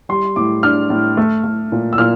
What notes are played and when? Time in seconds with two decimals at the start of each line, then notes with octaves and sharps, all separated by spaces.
0.09 G3 C6
0.36 A2 D6
0.63 D4 F6
0.90 A2
1.17 A3
1.44 A3
1.72 A#2
1.93 E6
1.98 A#2 F6